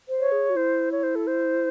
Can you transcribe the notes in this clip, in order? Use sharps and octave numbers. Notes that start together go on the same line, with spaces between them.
C5
C#5
G#4
F#4
E4 C5
C#5
C5
A4
C5